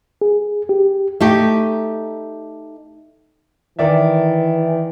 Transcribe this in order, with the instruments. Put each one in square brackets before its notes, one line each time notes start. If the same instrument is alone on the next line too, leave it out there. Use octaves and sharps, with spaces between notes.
[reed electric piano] G#4
G4
[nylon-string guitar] A3 D#4 G4
[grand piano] D#3 D5 E5 [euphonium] E3